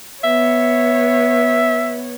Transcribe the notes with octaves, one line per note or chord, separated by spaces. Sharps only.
B3 C#5 E5